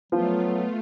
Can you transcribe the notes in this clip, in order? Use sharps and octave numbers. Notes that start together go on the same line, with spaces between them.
F3 F#3 A3 B3 F4